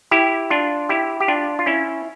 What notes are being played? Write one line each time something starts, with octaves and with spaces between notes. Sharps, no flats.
E4 G4
D4 F4
E4 G4
G4
D4 F4
F4
C#4 E4